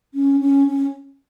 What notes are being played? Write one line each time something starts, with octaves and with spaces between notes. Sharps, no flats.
C#4
C#4
C#4